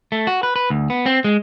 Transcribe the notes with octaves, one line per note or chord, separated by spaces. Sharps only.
A3
F#4
B4
B4
D2
B3
C4
G#3